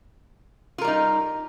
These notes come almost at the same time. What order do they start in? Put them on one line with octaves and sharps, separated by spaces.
F4 A#4 G3 D#4